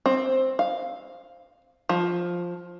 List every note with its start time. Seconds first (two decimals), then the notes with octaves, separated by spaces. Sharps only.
0.06 C4
0.59 F5
1.89 F3